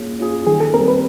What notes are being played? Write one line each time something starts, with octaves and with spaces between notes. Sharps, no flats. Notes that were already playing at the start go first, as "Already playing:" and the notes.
Already playing: A#3 C#4 F4 G#4
C#4 F4 G#4
D#3 G#4
A4
G3 C4 A#4
B4